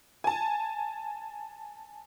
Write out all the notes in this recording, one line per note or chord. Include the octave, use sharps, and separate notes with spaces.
G#5 A5